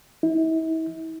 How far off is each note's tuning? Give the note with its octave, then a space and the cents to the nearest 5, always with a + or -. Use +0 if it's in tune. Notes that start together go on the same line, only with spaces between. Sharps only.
E4 -40